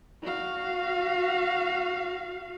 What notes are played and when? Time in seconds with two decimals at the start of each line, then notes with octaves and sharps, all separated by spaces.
0.22 F#4 F5